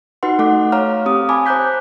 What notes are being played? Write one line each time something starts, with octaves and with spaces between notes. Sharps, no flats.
D#4 F#4 B4 F#5 C6
A3 A4 F#5 D6
C#5 F5 A#5 F6
C4 G4 D#6
G#5 A5 B5 D6
C5 A#5 D6 F#6 G6 B6